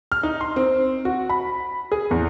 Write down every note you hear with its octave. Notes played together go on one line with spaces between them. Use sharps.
F6
D#4
C6
C4
F#4
B5
G#4
E2